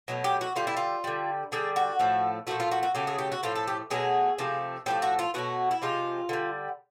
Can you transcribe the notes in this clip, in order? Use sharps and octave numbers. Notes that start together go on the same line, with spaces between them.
B2 F#3 A3
G4
F#4
D3 G3 F4
E4
F4
D3 G3
D3 G3 G#4
F#4
A2 F3 A3
A#2 F3 A3 F#4
F4
F#4
F#4
C#3 F#3 A3 G4
G#4
G4
F#4
A2 F3 A3 F4
A4
G4
B2 F#3 A3 G#4
C3 F3 A3
A2 F3 A3 G4
F#4
F4
B2 F#3 A3 F#4
E4
C3 F3 G#3 F4
D3 G3